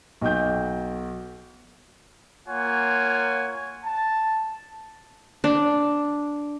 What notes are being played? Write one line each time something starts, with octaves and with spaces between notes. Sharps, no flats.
B1 F#4 G5 G6
A#3 F4 C#5 F#5 G#5
A5
D4